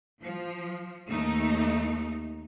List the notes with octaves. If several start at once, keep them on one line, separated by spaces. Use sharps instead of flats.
F3
D#2 A3 D#4